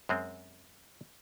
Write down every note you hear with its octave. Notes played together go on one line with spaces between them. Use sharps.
F#2 G#3 C4